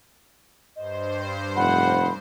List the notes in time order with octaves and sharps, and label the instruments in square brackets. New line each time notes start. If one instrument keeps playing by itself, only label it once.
[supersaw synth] G2 C5 [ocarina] D#5
[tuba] F1 [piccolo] F#5 [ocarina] B5